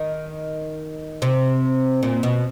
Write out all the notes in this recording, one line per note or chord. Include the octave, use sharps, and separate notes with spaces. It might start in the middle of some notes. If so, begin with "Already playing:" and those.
Already playing: D#3
C3
A#2
B2